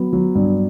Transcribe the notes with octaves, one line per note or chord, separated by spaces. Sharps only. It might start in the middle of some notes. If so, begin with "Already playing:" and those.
Already playing: F#3 B3
F#3
G2